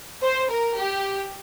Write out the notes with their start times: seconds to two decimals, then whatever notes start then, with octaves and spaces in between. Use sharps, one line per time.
0.23 C5
0.51 A#4
0.79 G4